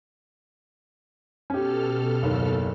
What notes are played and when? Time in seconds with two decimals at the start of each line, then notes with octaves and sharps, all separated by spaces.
1.50 B2 C#4 G4 A4 F6
2.23 F#1 D#2